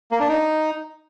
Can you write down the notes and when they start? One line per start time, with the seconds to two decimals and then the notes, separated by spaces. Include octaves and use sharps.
0.12 A#3
0.20 D4
0.29 D#4